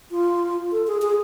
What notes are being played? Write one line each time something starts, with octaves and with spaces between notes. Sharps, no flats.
F4
A4
G#4
G#4